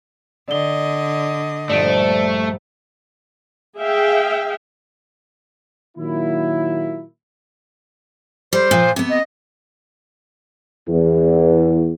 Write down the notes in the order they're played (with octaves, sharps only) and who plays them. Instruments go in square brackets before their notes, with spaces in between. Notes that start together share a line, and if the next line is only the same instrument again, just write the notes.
[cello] D3 D#5 [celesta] D5 G7
[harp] A#1 G2 [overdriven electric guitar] A3 [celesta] D5 D7
[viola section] G#4 E5 F5 G5
[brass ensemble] A#2 D#3 F#3 A#3 E4
[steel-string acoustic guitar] G3 [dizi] C5
[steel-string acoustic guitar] A#2 F3
C3 B3
[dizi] D#5
[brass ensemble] E2